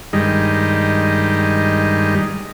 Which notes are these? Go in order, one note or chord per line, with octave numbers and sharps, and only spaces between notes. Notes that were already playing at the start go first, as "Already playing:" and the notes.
G2 D#3 G3 G#3 D#4